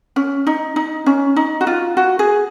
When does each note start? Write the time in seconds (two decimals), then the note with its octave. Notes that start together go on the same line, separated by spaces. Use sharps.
0.16 C#4
0.47 D#4
0.76 D#4
1.06 C#4
1.36 D#4
1.61 F#4
1.67 F4
1.97 F#4
2.19 G#4